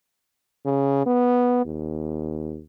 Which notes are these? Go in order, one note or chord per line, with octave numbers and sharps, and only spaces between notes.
C#3
B3
D#2